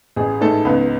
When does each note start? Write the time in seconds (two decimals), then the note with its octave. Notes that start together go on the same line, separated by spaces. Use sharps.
0.16 A1 G#4
0.41 G#2 A3 A4
0.65 C#2 B3 B4